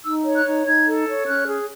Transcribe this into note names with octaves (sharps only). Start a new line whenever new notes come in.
D#4 E6
C#5
F#6
D#4
D#4 G#6
A4
C#5
C#4 F#6
G#4